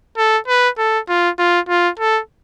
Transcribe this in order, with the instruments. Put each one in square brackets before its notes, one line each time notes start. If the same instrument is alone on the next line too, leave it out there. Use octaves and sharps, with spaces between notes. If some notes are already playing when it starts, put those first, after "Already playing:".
[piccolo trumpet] A4
B4
A4
F4
F4
F4
A4